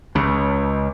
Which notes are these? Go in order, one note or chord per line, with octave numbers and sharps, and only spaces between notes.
C#2 C#3